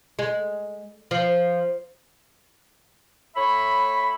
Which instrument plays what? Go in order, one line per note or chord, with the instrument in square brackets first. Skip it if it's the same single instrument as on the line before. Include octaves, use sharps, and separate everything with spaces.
[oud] G#3
F3
[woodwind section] A2 C#5 E5 B5